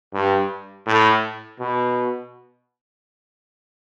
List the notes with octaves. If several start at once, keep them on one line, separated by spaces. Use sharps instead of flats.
G2
A2
B2